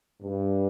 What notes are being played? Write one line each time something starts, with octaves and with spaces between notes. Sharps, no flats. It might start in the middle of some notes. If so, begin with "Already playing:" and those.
G2